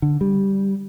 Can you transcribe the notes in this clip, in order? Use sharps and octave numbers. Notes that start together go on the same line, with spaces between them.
D3
G3